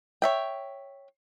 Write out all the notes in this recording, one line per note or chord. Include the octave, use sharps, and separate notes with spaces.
C#5 E5 G5